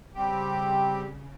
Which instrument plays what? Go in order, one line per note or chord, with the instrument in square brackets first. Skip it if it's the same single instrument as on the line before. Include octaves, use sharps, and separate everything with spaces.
[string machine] C#3 [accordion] G3 C4 G4